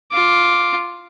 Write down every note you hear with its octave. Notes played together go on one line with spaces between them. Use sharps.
F4 D6